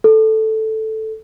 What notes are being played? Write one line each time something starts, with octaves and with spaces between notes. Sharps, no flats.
A4